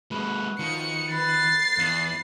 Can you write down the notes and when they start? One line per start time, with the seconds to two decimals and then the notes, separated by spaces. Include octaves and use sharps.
0.11 G#3 A#3 F#4 B4
0.59 D#3 F3 C#6 C#7
1.11 B4 A6 C7
1.78 E2 F5